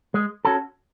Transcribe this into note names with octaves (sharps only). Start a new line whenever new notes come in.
G#3
C#4 F#4 A4